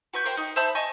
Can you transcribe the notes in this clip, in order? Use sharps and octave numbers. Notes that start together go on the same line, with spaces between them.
F#4 B4 C#6 G6
A#4 C5 G5
D#4
C5 E5 A5 B5
D#5 G#5 A5 C#6